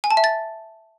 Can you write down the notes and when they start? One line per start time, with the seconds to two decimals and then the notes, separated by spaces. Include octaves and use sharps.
0.04 G#5
0.11 A5
0.17 E5
0.24 A6